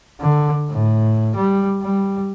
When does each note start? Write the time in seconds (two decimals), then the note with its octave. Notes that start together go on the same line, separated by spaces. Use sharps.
0.21 D3
0.70 A2
1.36 G3
1.83 G3